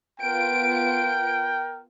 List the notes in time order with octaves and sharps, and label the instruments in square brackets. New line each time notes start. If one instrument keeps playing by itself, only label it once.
[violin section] B3 F4 D7 [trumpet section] A#4 G5